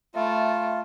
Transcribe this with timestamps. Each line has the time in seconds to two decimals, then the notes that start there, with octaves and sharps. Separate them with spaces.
0.15 A3 F4 E5 B5